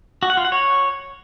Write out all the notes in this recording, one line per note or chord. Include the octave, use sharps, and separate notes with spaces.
F#4
F#5
F4
F#5
C#5